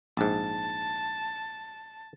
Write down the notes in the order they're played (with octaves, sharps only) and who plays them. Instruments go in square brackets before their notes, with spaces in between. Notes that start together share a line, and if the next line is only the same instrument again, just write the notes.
[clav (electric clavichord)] A#1 G#2 [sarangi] A5